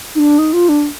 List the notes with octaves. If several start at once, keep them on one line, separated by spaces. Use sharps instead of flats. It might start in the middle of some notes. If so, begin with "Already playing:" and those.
D#4
D4
D#4
F4
D4